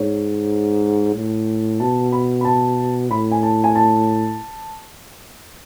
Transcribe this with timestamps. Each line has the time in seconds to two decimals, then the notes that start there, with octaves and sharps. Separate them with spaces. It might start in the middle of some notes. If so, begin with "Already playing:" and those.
Already playing: G#2 C#5
1.15 A2
1.80 B2 A5
2.12 B5
2.41 B5
2.45 A5
3.10 A2 B5
3.31 G#5
3.43 A5
3.64 G#5
3.75 A5